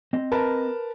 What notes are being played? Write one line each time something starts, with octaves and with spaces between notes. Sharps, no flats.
C4 D#5
A#4 B4 A5